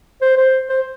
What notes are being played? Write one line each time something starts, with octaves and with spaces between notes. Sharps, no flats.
C5
C5
C5